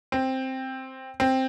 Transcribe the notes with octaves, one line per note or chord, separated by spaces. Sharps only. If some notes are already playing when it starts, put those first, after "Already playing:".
C4
C4